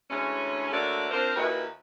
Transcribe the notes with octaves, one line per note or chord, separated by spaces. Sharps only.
D2 E3 G#3 C#4
D3 A3 A#3 F#4 C#5 D5
C4 D4 F4 A#4 C5
D#2 A#2 D#4 E4 F#4 B4